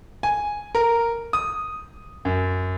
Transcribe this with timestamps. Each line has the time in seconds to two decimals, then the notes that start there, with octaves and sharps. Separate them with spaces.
0.23 G#5
0.75 A#4
1.33 D#6
2.25 F#2